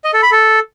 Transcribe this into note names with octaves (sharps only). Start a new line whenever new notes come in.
D#5
A4
B5
A4